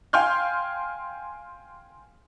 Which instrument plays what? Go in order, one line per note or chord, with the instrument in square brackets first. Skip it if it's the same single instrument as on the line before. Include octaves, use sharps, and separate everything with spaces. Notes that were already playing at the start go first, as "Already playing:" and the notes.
[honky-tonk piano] F5 G5 G#5 C6 F6 G6